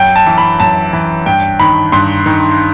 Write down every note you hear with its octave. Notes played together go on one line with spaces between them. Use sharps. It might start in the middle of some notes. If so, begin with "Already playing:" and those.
Already playing: F#2 G5
A5
E3
B5
F#2 A5
E3
G2 G5
D#3 B5
G2 C6
D#3